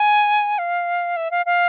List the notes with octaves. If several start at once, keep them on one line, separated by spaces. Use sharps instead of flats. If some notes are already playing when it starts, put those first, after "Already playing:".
Already playing: G#5
F5
E5
F5
F5